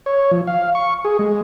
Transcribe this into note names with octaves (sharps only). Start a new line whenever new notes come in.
C#5
F3
F5
C#6
G#4
G#3